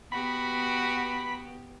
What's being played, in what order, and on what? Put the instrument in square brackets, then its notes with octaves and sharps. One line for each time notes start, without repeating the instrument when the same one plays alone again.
[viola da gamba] B3 G4 [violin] F#4 [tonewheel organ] B5